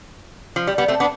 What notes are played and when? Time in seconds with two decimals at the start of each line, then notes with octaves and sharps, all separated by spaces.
0.56 F3
0.67 G3
0.78 G3 B3
0.88 A3 C4
1.00 B3 D4